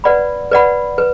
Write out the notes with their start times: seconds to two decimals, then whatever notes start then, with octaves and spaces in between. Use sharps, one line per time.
0.04 B4 D5 F#5 B5
0.51 B4 D5 F#5 B5
0.98 B4